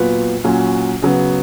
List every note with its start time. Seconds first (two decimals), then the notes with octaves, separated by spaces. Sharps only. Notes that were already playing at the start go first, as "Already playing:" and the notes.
Already playing: A#2 F#3 B3 F4 B4
0.44 A#2 F#3 C#4 F4
1.02 C#3 F#3 B3